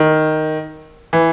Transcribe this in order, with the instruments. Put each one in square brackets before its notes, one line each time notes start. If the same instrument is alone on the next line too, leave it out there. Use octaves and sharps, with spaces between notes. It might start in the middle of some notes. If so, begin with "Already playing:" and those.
Already playing: [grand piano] D#3
E3